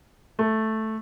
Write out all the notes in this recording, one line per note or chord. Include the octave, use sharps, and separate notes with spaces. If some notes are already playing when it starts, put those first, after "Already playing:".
A3